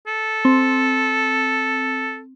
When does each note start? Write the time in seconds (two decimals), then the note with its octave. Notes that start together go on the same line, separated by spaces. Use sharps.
0.07 A4
0.45 C4